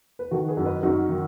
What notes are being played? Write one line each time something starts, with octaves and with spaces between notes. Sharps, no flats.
B4
D#3 F#4 A4
G#4 B4
F#2
B4 D#5
F#2 D#4 F#4
D#3